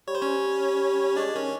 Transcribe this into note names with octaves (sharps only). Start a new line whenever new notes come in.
G3 C#5
C5
C#4 C#5
G#3 D4 D5
D#3 C#4 C#5